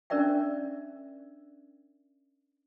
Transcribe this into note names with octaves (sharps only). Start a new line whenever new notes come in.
C#4 D4 A#4 D5 E5 G5